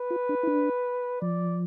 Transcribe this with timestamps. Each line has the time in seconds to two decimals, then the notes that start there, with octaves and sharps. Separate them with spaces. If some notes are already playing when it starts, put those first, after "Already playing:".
Already playing: B4
0.11 F4
0.29 D4
0.43 E4
0.47 D4
1.21 F3 D5